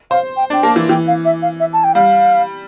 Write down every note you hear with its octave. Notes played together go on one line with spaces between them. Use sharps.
C5 F5
G5
D4
G5
A#3 A5
E3
E3 G5
F5
E5
F5
E5
A5
G5
G3 F5